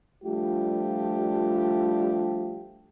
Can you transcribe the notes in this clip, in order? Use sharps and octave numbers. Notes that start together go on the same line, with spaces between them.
F3 G3 A3 D4 F4 G4